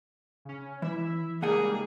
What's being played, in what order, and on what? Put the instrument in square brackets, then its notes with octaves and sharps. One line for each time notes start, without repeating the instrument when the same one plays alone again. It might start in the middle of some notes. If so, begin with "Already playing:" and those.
[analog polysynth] C#3 C#4
[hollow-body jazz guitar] E3 [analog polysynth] E4 E5
[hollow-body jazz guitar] C#2 F#5 G#5 [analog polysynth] G3 A#3 D#4 [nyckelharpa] G#4